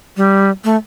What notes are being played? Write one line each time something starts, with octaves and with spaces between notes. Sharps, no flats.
G3
A3